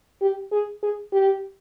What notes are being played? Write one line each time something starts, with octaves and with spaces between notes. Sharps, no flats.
G4
G#4
G#4
G4